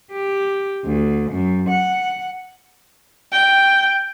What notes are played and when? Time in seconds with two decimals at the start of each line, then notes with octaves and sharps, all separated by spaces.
0.12 G4
0.85 D2
1.31 F#2
1.70 F#5
3.33 G5